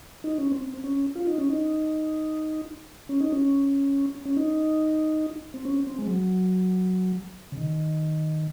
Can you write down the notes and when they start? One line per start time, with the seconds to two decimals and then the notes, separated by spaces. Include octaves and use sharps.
0.24 D#4
0.38 C#4
0.51 C4
0.84 C#4
1.16 F4
1.27 D#4
1.38 C#4
1.50 D#4
3.09 C#4
3.20 D#4
3.32 C#4
4.25 C#4
4.36 D#4
5.54 C4
5.65 C#4
5.87 C4
5.98 G#3
6.07 F#3
7.52 C#3
7.57 D#3